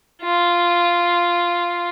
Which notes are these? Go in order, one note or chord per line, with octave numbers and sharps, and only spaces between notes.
F4